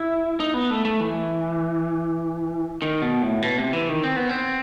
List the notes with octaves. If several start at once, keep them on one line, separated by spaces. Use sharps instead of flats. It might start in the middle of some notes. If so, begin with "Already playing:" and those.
Already playing: E4
D#4
B3
A3
A3
E3
D#3
B2
A2
B2
C3
E3
D#3
C4
B3
C4